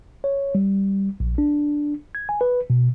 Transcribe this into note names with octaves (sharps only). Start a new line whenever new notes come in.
C#5
G3
A#1
D4
G#6
G#5
B4
B2